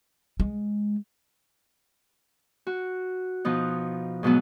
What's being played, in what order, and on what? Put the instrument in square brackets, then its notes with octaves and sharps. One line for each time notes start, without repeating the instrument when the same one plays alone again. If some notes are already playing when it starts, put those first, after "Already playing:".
[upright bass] G#3
[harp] F#4
B2 F3 B3 D#4
G#2 B2 F#3 B3